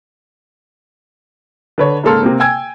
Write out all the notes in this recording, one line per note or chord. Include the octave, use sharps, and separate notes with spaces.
D3 B4 C#5
G#2 C#3 A#3 A4 C6 F6
C3 A#3 C4
G5 G#5 E6 G#6